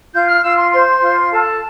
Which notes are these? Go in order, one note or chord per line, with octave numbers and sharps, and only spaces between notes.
F4 G6
F6
F4 E6
C6
C5 C6
F4
A4 A5